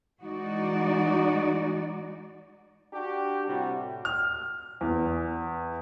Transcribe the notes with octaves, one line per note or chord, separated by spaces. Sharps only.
E3 G#3 D#4 F#4 D5
D4 F#4 G4
A2 C3 G3 F#4
F6
E2